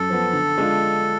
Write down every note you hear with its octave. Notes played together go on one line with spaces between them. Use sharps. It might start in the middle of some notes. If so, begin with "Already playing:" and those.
Already playing: F#2 A4
F3 B3
D3
G#3 D4 F4